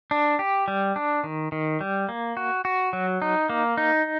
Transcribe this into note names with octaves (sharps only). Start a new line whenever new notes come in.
D4
G4
G3
D4
D#3
D#3
G3
A#3
F#4
F#4
F#3
D#4
A#3
D#4